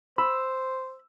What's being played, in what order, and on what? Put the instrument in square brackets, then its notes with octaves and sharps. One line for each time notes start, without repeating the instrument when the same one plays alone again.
[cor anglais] C5 [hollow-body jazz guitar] B5 [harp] E6